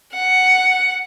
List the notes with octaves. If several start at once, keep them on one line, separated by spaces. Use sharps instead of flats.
F#5